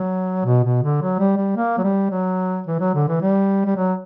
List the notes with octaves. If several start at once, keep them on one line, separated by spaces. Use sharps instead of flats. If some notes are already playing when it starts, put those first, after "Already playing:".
Already playing: F#3
B2
B2
D3
F#3
G3
G3
A#3
F#3
G3
F#3
E3
F#3
D3
E3
G3
G3
F#3